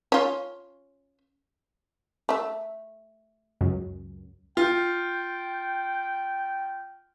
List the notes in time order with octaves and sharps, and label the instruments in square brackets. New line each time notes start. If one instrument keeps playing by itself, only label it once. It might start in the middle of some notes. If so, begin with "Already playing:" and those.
[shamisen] C#4 F4
A3 E5
[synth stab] C#2 F#2
[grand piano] F4 [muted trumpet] G5